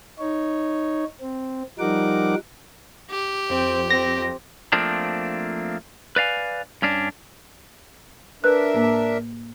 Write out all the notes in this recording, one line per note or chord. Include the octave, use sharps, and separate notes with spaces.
D#4 C#5
C4
F3 G3 D#4 A#4 F#5 D6
G4
F2 C4
C4 A#6
F3 A3 A#3 C4 D4
B4 D5 F5 G#5
G2 C#4 D4
D4 A#4 B4 E5 F#6
A2 A#3